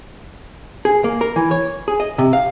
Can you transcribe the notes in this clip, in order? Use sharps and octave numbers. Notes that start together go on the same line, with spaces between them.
G#4
A#3
A#4
E3
C#5
G#4
D#5
C3
F5